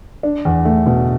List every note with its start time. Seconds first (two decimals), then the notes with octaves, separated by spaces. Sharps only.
0.23 D4
0.45 E2
0.65 A3
0.86 B2